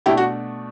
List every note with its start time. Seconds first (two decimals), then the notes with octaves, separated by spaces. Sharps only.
0.06 B2 A3 D4 E4 G4
0.17 F#4